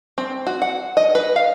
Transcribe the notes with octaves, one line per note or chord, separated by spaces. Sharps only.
C4
F#4
F#5
D#5
B4
F5